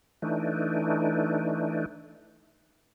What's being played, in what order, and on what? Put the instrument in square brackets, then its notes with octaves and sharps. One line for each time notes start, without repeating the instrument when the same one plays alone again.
[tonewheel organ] E3 A3 D4 D#4